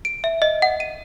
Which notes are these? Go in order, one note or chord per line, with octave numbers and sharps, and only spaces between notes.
D7
E5
D#5
F#5
D#7